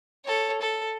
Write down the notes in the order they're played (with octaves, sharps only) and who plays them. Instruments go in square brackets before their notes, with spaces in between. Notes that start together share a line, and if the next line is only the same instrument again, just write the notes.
[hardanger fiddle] A4 C#5
A4